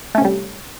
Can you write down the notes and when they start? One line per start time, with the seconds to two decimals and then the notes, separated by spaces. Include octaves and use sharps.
0.15 A3
0.18 C#4
0.21 C3
0.24 G3